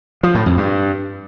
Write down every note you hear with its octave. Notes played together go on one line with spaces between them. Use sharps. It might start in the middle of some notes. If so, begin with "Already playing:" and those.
F3
A2
F2
G2